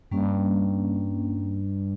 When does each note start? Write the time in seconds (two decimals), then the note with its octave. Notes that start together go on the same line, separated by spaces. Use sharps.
0.12 G2 G3 A#3 C#4